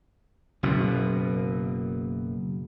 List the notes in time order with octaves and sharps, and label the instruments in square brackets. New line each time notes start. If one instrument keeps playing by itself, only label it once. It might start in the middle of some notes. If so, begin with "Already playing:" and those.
[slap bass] F#1 F#2 B2